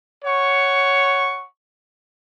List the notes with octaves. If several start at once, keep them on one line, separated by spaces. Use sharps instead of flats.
C#5 F#5 C#6